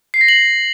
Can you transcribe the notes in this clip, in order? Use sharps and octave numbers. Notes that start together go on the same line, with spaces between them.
C7
A#6
F#7